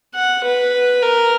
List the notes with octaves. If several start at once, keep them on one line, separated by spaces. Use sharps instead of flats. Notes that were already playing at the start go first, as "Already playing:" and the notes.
F#5
B4
A#4